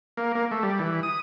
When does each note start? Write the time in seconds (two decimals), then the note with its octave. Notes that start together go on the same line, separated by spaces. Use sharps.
0.17 A#3
0.35 A#3
0.51 A3
0.63 G3
0.79 E3
1.03 D#6